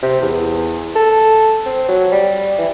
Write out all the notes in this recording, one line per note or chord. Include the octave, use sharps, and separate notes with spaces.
C3
E2
A4
C4
F#3
G3
E3